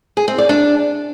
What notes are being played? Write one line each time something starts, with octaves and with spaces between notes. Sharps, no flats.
G#4
C4
D5
D4